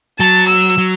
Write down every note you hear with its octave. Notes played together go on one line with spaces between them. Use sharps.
F#3 A5
E6
F#3